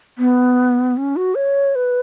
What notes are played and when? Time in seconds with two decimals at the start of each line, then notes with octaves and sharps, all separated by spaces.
0.18 B3
0.97 C#4
1.16 F#4
1.35 C#5
1.75 B4